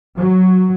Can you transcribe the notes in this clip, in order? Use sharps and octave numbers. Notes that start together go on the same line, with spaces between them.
F#3